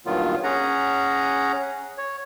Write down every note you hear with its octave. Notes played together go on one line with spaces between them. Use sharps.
G2 A#2 D#3 F#3 B3 F4
C#4 G#4 F#5 A#5
C#5